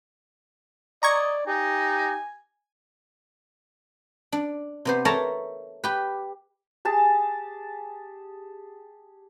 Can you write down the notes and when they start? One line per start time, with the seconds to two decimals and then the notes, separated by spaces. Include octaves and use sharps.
1.03 D5 D#5 A#5 C#6 G#6
1.47 D#4 G4 G#5
4.32 D4
4.85 C3 B3 C5
5.05 A4 A#4 C#5 E5 A5 A#5
5.84 G4 B4
6.85 G4 G#4 A5